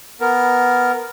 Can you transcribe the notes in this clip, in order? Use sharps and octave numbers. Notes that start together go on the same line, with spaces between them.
B3 A#4